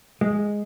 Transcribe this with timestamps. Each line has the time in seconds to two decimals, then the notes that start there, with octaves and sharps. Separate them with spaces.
0.21 G#3